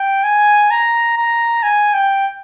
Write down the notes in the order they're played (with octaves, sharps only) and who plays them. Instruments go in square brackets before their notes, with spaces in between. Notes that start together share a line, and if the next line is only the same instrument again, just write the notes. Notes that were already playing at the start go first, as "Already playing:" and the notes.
Already playing: [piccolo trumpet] G5
G#5
A#5
A#5
G#5
G5